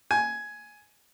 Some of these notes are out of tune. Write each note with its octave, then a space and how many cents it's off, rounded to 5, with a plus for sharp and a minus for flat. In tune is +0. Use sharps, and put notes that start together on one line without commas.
G#5 +10